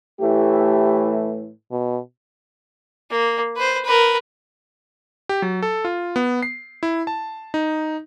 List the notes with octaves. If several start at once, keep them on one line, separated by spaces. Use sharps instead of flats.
A2 E3 A3 G4
B2
A#3
B4 C5
A#4 B4
G4
F#3
A4
F4
B3
C7
E4
A5
D#4